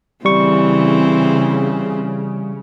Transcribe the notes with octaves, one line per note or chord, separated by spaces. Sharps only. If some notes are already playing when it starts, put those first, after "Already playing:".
C#3 E3 G3 C4 C#6